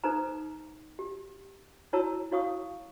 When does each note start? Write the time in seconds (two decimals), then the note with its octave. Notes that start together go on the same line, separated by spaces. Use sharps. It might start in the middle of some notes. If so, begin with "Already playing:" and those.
0.04 D#4 A4 B4 C5 A#5
0.99 G4
1.93 E4 F#4 C#5 A5 A#5 E6
2.32 E4 F#4 C#5 F5 C#6 D#6